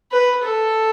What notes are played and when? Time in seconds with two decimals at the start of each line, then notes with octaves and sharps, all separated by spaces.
0.12 B4
0.43 A4